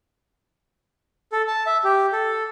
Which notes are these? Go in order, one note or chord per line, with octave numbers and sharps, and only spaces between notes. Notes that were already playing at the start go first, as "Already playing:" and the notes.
A4
A5
E5
G4
A4